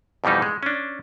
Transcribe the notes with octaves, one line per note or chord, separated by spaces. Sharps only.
F2 B2 E3 G3 D#4
G#3
C#4 D4